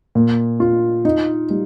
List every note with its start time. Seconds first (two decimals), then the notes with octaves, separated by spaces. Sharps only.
0.15 A#2
0.60 F4
1.05 D#4
1.50 G3